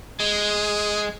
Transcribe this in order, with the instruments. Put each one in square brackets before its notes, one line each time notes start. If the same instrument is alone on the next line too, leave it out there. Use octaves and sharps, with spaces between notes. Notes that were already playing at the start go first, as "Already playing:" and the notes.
[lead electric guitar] G#3 [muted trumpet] G#4